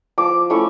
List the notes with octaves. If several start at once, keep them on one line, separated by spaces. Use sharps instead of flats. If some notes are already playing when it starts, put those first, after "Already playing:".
F3 D6
A3 C#4 E4 C#6